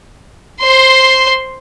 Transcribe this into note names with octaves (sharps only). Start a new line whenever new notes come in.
C5 C6